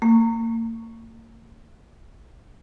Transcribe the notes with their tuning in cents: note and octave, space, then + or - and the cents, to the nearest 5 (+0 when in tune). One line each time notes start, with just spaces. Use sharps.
A#3 -40 C#6 +0